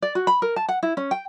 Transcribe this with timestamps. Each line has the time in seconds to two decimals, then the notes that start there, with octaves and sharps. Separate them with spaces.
0.02 D5
0.15 F#4
0.27 B5
0.42 A#4
0.56 A5
0.68 F#5
0.83 E4
0.97 C#4
1.11 G5